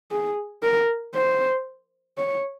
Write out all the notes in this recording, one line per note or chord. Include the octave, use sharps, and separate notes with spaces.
G#4
A#4
C5
C#5